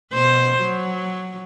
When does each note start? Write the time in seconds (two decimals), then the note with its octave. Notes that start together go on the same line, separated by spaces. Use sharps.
0.13 B2 C5
0.62 F#3